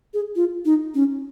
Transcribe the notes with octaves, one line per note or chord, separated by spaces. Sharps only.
G#4
F4
D#4
C#4